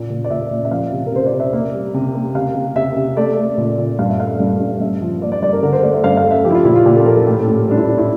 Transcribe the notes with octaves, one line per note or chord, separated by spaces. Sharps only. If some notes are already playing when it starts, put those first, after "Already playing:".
Already playing: A#2 A#3
A#2
D5
A#2 E5
A#2
E5
F3 F5
C3
A#4
C3 C5
D5
C3
E5
A#3
G3
C3
A#3
C3 F5
C3
C3 E5
C3
A3 D5
A3
A#2
A#2
G2 F5
E5
A3 F5
G2
G2
G2 E5
F3
A#3 D5
D5
G2 D5
A#4
D3 A#4
C5
A3 D5
E5
G2 F5
F5
A3
E5
F3 G4
E4
F4
A#2 E4
F4
A#2 G4
A4
F3 A#4
A4
A2 G4
A4
A2
G3 D4
E4
A2 E4
E4